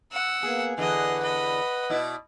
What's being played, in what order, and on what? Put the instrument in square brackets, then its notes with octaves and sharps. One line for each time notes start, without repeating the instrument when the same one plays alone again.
[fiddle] F#5 E6
[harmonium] A#3 B3 [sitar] G#4
[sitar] E2 D3 [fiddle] G#4 D#5 [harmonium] B4 F#5
[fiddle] D#5 B5
[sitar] B2 E4 D5